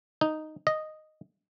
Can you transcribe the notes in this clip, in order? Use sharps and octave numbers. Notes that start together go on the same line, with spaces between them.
D#4
D#5